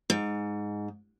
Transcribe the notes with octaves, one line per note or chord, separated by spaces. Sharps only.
G#2